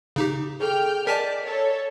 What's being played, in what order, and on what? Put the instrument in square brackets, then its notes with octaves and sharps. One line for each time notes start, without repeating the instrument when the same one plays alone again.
[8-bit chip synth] C#3 D#4 G4
[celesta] G#4 A4 [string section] G5 F6 G6
[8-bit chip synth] A#4 G#5 A5 [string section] D5 [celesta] D#5 B6
[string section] A4 C#5